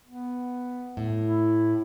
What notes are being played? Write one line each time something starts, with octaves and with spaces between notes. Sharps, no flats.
B3
A2
E4